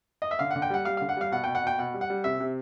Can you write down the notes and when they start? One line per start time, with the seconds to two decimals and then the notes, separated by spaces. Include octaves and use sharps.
0.22 D#5
0.31 E5
0.39 D3 F5
0.51 F#5
0.56 D3
0.62 G5
0.70 G3 F#5
0.85 G3 F5
0.97 D3 F5
1.09 F#5
1.17 G3 F5
1.32 B2 F#5
1.44 B2 G5
1.55 F#5
1.63 B2 G5
1.79 B2 F#5
1.94 G3
2.01 F#5
2.10 G3
2.24 C3 E5
2.40 C3